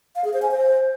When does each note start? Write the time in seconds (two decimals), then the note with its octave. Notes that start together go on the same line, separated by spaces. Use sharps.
0.16 F5
0.24 G#4
0.33 C5
0.42 G#5
0.51 C5